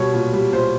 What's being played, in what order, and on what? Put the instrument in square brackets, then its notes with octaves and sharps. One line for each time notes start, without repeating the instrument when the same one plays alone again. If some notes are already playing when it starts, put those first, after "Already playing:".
Already playing: [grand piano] B2 G3 C#5
A#2
G3
A#2 C5